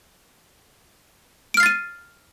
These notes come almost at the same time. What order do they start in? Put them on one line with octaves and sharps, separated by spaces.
D7 F6 C7 A6 D#7